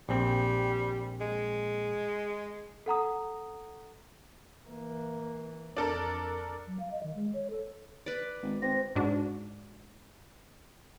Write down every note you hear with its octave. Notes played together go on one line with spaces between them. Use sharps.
A#1 G3 C4
G#3
A4 F#5 A#5 D#6
E3 A#3
F2 D4 A4 A#4
F#3
F5
D#5
D#3
G#3
C#5
A4
B4 D5
G#1
G#1 C4 A#6
G#2 D4 F#4